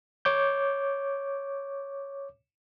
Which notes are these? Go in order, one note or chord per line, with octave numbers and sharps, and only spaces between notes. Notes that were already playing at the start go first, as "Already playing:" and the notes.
C#5 D6 G6